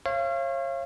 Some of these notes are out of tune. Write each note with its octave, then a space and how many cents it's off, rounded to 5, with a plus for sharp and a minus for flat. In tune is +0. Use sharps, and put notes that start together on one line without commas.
C#5 -35 F5 -35